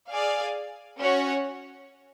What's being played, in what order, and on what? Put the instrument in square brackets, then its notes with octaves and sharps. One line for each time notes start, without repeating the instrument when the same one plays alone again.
[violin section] G#4 D5 F5 G#5
C#4 F#4 C#5 F#5